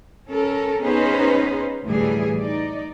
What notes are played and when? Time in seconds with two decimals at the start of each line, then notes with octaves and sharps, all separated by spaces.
0.28 C#4 A4 A#4
0.82 B3 C#4 D#4 G#4 B4 C5
1.84 D2 A2 E3 G3 G#4
2.40 D#4 D5